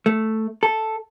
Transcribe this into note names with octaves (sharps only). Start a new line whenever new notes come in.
A3
A4